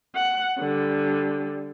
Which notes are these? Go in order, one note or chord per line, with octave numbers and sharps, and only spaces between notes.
F#5
D3 G3